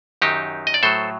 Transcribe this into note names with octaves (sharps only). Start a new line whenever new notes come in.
F#2 D#3 F#3 D#4 G4
D#5
D5
A2 F#3 A4 C5